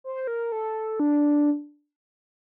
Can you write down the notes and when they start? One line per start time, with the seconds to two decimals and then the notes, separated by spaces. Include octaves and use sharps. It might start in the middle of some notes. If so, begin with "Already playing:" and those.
0.04 C5
0.27 A#4
0.52 A4
1.00 D4